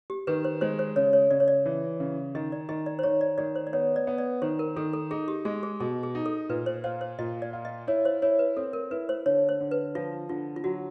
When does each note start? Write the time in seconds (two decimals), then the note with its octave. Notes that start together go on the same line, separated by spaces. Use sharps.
0.10 G4
0.27 D#3 B4
0.45 C5
0.61 G#3 C5
0.79 C5
0.96 C#3 C#5
1.13 C#5
1.31 C#3 D5
1.40 C#5
1.48 D5
1.66 E3
2.00 C#3
2.35 D#3 D#5
2.52 D5
2.69 D#3 D#5
2.86 D5
2.99 C5
3.03 D#3 C#5
3.21 D5
3.38 D#3 D5
3.56 C5
3.67 D5
3.73 B3 C#5
3.96 D5
4.07 B3
4.18 D5
4.42 D#3 C5
4.59 A#4
4.76 D#3 A4
4.93 A4
5.11 D#4 G#4
5.28 G4
5.45 G#3 G#4
5.63 G#4
5.80 B2 G#4
6.03 G#4
6.15 D#4
6.26 A4
6.49 A#2 B4
6.66 C5
6.84 F4 C5
7.01 C5
7.19 A#2 D#5
7.42 D5
7.53 F4
7.65 D#5
7.87 E4 C#5
8.05 C5
8.22 E4 C#5
8.39 B4
8.57 C4 A4
8.73 A#4
8.91 E4 B4
9.09 C5
9.26 D3 C#5
9.49 C5
9.60 D3
9.71 B4
9.95 F3 F4
10.29 D3 F4
10.56 F4
10.64 F#3 F#4